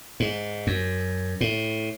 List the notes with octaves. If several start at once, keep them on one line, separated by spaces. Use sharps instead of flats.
G#2
F#2
A2